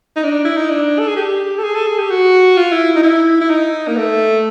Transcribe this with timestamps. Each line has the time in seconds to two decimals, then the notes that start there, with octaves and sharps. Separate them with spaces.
0.16 D#4
0.23 D4
0.44 E4
0.57 D#4
0.69 D4
0.99 A4
1.07 G#4
1.16 G4
1.58 A4
1.63 G#4
1.75 A4
1.87 G#4
1.98 G4
2.10 F#4
2.57 F4
2.72 E4
2.96 D#4
3.03 E4
3.40 E4
3.50 D#4
3.87 A#3
3.97 A3